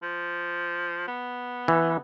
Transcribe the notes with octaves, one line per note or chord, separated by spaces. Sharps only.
F3
B3
E3